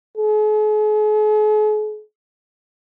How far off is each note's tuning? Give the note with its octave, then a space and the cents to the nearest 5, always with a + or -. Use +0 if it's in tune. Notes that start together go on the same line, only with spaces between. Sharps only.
G#4 +45